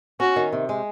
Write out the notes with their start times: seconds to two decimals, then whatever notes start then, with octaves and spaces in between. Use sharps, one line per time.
0.20 C#4 F#4
0.36 D#3
0.53 C3
0.69 G#3